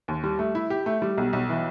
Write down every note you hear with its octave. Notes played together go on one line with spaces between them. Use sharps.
D#2
G3
A3
E4
G4
A3
G3
B1
B1
E3